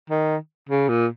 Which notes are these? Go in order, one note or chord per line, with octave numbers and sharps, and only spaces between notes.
D#3
C#3
A#2